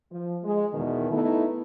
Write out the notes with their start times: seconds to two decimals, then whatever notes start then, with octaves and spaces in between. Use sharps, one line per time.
0.11 F3
0.44 G#3
0.74 E2 B2 D#3
1.11 A3 B3 D#4 E4